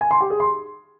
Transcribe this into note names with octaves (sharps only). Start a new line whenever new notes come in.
G#5
C6
G4
G#4
C6